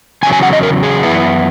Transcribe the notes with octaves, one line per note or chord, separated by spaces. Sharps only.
E2 C#3 F#3 G#5
G#5
F#5
D#5
A#4
G#4
F#2 E3 B3 E4